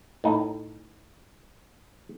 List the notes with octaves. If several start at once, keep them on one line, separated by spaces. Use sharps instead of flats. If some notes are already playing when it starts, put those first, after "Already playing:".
A2 D#4